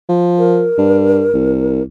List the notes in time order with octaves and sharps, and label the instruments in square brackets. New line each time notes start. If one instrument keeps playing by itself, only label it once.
[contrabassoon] F3
[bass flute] A#4
[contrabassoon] G2
C2